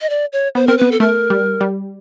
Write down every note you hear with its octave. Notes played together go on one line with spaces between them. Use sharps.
D#5
D5
C#5
B3 C5
C4 A#4
B3 B4
A4
A3 A#4
G3
G3